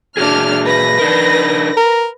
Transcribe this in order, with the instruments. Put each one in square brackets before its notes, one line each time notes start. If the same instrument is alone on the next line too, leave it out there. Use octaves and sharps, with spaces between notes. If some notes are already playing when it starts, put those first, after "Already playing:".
[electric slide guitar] A#2 F#4 G#4 [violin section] D4 F6
[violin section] B4 A#6
[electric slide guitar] D4 D#4 A#4
[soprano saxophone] A#4